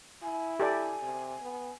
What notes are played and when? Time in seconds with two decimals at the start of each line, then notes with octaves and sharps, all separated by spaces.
0.22 E4 G#5
0.60 G4 A4 D5 G#5
1.03 C3
1.42 B3